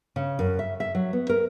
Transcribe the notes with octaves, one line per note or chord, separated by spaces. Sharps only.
C#3
F#2
E5
E5
F#3
B3
A#4